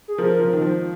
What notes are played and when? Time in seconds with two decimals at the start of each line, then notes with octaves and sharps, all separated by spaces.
0.08 G#4
0.18 F3 A#4
0.39 F3
0.53 D#3
0.62 F3